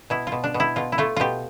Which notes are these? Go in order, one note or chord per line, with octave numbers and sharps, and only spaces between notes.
B2 E4
F4
B2
D4
B2
E4
B2 F4
E4
A3 F4
B2 F4 G4